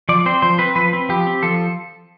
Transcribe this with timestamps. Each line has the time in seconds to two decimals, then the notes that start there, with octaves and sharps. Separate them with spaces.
0.09 F3 D5
0.26 C4 C5
0.42 F3 C5
0.59 C4 B4
0.76 F3 B4
0.93 C4
1.09 F3 G4
1.27 C4
1.43 F3 A4